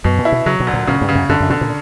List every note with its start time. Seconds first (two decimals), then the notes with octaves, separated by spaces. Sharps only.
0.04 F#2 B2
0.18 A#2
0.25 E4
0.32 B2
0.46 C#3 F#3
0.60 B2
0.67 D2
0.73 A#2
0.87 A#2 C#3
1.01 G2
1.09 C#3
1.15 F#2
1.29 F#2 D3
1.40 F#2
1.50 B2 D3
1.61 A#2